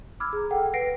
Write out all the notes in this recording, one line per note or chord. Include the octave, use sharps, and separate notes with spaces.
B5 D6 E6 F6 G#6
G#4 A#5
A4 F#5 G5
B4 F#5 A#6 C7 D7